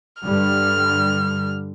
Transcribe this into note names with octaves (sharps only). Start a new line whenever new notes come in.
G2 D3 G3 F6